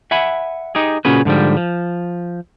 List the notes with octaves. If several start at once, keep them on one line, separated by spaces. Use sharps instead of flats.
E5 F#5 G#5 B5
D#4 G4 G#4
A#2 C#3 C#4 F#4 G#4 B4
G#2 D3 F3 G3
F3